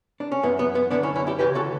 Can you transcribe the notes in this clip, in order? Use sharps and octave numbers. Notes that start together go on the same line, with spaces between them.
D4
C#4
F#2 E3 B3
B3
B3
F#2 D3 B3 D4
C#4 E4
C#4 E4
E4 G4
D2 C#3 E3 G4 B4
F#4 A4